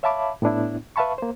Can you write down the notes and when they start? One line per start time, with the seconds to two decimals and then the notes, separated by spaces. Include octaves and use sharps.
0.03 C#5 E5 F5 A5 B5 D6
0.42 A2 B3 D4 E4
0.96 B4 E5 F5 A5 B5 C#6
1.18 A#3 C5